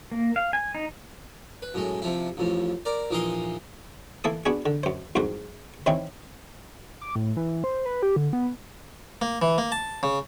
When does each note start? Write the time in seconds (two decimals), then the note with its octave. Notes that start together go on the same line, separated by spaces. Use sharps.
0.12 A#3
0.36 F5
0.53 G#5
0.75 D#4
1.62 B4
1.74 F#2 A2 G#3
2.02 C3 F3 E4
2.37 A1 F2 A2
2.85 A#4 D5
3.11 A#1 E3 D#4 A#4 D#5 C6
4.24 E3 A#3 A4 D#6
4.46 B3 D4 F#4 G#4
4.66 D3
4.83 F#2 C5
5.15 C2 F2 G#2 F#4 A#4 C5
5.86 D#3 E3 C4 C#4 D#4 E4
7.01 D6
7.15 A2
7.37 E3
7.64 C5
7.86 B4
8.02 G4
8.16 D3
8.33 B3
9.22 A#3
9.42 E3
9.58 A#3
9.72 A5
10.03 C#3